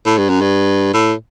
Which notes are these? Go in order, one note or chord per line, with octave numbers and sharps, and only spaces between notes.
A2
G2
F#2
G2
A2